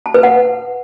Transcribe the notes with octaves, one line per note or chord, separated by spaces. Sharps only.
A5
B4
F#5